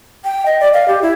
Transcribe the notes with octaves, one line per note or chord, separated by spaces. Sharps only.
G5
D#5
D5
F5
G4
E4